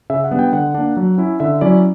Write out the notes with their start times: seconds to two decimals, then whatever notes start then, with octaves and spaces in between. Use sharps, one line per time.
0.10 C#3 E5
0.24 F#5
0.31 G3 B3 D4
0.39 G5
0.53 D3 F#5
0.74 A#3 D4
0.97 F#3
1.18 C#4 E4
1.40 D3 E5
1.61 F#3 C#4 E4 D5